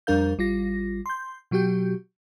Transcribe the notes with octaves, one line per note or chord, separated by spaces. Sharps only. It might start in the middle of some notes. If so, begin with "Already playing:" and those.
F2 G3 D4 A#4 F5 G6
A1 G3 F4 A#6
C6 G6
B2 F#3 F#4 G4 G6